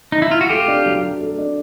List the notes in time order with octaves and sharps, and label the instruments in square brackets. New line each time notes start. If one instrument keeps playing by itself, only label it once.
[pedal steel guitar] D#4
E4
F4
F#4
[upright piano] A3 [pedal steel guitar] F4 G4
[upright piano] D4
F#3
F#3
A3
D4